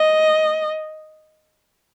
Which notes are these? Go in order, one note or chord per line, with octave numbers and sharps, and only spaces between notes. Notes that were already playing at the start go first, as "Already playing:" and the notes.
Already playing: D#5